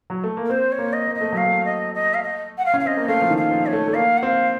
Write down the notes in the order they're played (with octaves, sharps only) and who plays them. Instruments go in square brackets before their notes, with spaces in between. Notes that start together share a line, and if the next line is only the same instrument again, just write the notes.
[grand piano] F#3
A3
A#3
[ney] A#4
[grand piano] C4 [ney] C5
[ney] C#5
[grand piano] A#3
[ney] D#5
[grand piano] A#3
[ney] D#5
[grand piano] A3
[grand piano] F#3 [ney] F5
[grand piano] A3
[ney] D#5
D#5
F5
D#5
F#5
F5
[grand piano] C#4
[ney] F5
[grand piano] C4 [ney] D#5
[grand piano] A#3
[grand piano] A3 [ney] F5
[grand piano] F3
D#3
[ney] F5
[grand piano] F3
[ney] C#5
[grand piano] A3
A3
[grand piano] A#3 [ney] F5
[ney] F#5
[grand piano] C4 [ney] F5